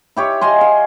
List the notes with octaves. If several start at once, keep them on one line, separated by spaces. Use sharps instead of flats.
E4 G4 C#5
D#5 F5 G#5 C6
F5